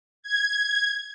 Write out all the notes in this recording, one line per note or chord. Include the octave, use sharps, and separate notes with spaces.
G#6